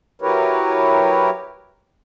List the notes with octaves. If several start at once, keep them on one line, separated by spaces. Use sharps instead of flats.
F#3 E4 G4 A#4 B4 C#5